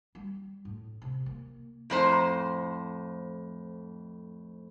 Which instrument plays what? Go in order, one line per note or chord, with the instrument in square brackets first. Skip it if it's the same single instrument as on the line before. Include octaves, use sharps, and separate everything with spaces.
[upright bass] G3
A2
C3
A#3
[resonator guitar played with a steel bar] F2 A2 C5 A#5